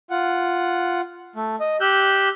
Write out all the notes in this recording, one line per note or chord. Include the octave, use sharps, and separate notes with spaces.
F4 F#5
A3
D#5
G4 E6 F#6 G6